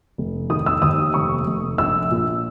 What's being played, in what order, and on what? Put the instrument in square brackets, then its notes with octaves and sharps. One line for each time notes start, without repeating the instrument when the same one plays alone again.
[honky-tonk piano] F1
D#3 D#6
E6
D#2 D#6
F1 C#6
F1
A#1 E6
A#2